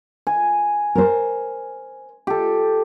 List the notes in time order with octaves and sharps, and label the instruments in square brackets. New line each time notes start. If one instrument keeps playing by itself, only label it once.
[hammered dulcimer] G#5
[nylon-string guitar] A#4 C5
[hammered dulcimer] G4 A4